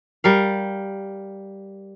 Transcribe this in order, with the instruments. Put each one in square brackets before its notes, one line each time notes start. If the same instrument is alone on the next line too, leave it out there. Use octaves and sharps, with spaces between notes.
[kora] G3 A#4 F5